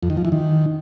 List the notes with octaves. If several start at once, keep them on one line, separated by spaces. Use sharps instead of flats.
F2
D#3
F3
E3
D#3